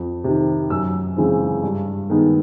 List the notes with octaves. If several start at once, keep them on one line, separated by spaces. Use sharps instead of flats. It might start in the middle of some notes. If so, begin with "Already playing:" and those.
Already playing: F2
C3 D#3
F#2 E6
C#3 E3 G#3 C4
G2
D#3 G#3 B3